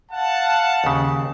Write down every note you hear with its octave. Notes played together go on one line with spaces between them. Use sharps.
F5 F#5 A5
D#2 C#3